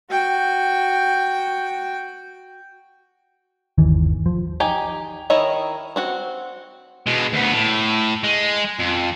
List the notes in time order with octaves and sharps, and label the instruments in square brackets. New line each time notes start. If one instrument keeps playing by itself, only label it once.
[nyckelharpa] F#4 G5
[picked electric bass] G1 D#2 E3
F3
[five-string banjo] D#4 G4 G#5
D#3 D#4 E4 C#5 D#5
C4 F#4 F#5
[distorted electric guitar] B2 G#3
D2 B3
A2
G#3
F2